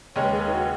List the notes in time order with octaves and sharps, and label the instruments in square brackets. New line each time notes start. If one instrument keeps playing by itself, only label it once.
[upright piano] D#2 C#3 G#3 C#4 [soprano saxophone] C#5
[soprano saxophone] B4
G#4
B4
D#4
F#4